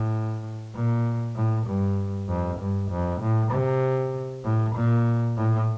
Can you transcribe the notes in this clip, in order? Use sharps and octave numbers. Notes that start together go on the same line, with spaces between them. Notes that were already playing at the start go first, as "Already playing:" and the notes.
Already playing: A2
A#2
A2
G2
F2
G2
F2
A2
C3
A2
A#2
A2